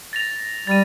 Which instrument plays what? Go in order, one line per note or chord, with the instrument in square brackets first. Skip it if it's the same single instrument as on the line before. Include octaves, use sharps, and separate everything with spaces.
[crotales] A6 A#6 F7
[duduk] G3 [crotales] A6 D#7